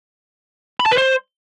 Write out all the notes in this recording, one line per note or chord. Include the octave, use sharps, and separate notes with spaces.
B5
A5
B4
C5